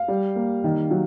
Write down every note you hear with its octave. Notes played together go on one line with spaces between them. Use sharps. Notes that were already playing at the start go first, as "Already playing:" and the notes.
Already playing: F5
G3
A#3
D#3
F#3